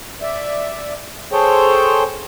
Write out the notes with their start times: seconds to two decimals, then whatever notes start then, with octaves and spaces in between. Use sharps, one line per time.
0.22 D5 E5
1.32 G#4 A4 C5 C#5 G5